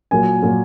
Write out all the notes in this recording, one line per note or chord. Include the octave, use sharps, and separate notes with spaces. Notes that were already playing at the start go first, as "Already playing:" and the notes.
A#2 F#3 A#3 G#5
A#2 F#3 A#3